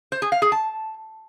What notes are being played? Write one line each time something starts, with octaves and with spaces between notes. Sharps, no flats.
C5
G#4
F5
G#4
A5